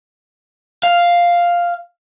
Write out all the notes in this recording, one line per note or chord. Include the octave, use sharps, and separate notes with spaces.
F5